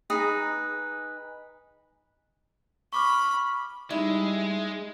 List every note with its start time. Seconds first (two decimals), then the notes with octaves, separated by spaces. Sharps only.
0.10 D#4 G#4 B4 A#5
2.93 B5 C#6 D6 F6
3.90 G3 G#3 D#4 E4